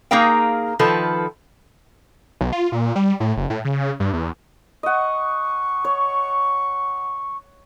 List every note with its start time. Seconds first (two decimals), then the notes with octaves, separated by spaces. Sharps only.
0.11 A#3 D#4 G#4 A#4 F5 G5
0.79 D#3 F3 A4 B4
2.41 B1
2.53 F4
2.72 A#2
2.96 G3
3.20 A2
3.37 F#1
3.50 A2
3.65 C#3
4.00 G2
4.13 E2
4.83 D#5 F#5 C#6
5.85 C#5